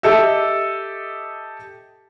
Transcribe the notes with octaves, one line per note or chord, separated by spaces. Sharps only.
G4 A4 D#5 E5